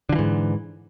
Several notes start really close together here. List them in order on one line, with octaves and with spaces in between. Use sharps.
D3 F3 E3 G#2